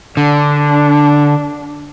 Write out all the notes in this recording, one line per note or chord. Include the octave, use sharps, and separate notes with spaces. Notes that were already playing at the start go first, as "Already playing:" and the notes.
D3 D4